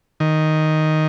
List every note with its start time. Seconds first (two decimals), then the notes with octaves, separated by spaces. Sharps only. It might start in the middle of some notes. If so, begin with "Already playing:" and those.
0.20 D#3